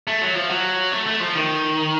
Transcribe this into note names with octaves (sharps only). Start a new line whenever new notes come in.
A3
F#3
F3
F#3
A3
A3
F3
D#3